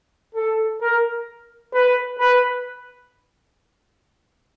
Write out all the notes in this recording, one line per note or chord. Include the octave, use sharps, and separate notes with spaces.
A4
A#4
B4
B4